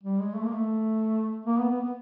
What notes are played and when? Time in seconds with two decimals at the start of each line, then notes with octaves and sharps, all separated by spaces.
0.03 G3
0.19 G#3
0.35 A3
0.44 A#3
0.53 A3
1.46 A#3
1.58 B3
1.70 B3
1.82 B3